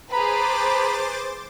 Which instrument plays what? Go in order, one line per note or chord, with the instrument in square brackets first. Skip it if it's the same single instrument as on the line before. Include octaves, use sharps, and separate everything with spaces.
[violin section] G#4 B4 [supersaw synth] C5 D6 A6 [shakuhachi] A#5 [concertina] B5